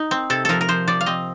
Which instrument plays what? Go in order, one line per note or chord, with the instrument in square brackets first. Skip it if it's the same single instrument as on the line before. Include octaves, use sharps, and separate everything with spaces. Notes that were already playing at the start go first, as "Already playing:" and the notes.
Already playing: [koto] D#4
C4
C3 A4
F3 A4 A#4
A#4
F3 C5
F3 D5
F5
C4 D#5